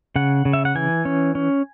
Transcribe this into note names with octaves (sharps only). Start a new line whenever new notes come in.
C#3 F#5
C#3
E5
F#5
E3 G#5
C#4
C#4